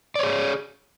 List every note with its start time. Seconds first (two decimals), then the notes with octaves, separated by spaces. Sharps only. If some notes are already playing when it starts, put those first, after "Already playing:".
0.16 D5
0.19 C#5
0.23 G#4